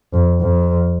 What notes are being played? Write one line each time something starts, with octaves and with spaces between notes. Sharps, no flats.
F2
F2